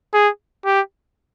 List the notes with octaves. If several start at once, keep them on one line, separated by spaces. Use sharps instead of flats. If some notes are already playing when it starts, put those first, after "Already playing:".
G#4
G4